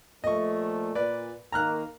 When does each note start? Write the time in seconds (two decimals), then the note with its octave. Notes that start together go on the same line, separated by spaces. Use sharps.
0.24 A#2 F3 A3 D#5 C#6
0.95 A#2 B4 D5
1.52 D#3 A#3 A#5 F6 F#6